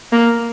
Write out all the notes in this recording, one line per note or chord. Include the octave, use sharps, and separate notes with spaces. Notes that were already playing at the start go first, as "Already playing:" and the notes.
A#3